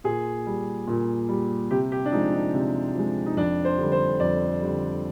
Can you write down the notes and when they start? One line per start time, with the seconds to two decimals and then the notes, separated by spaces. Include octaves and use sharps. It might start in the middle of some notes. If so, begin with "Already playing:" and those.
0.04 A#2 G#4
0.46 G3
0.87 A#2
1.29 G3
1.70 C3 G4
1.92 G4
2.06 D4
2.12 F3 D#4
2.15 G#3
2.33 D#4
2.54 C3
2.95 F3 G#3
3.26 D#4
3.37 F2 D4
3.65 C5
3.78 D3 G3
3.92 C5
4.20 F2 D5
4.61 D3 G3